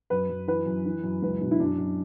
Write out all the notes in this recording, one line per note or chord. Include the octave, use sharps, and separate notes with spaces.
F#2 B4
F#2
E3 B4
F#2
E3
F#2
C#2 B4
B2
E4
F#2 D4
F#2